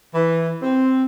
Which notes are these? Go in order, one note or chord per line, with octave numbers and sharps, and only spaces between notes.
E3
C4